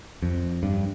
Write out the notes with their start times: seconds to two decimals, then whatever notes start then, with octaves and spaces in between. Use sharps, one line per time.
0.22 F2
0.63 G2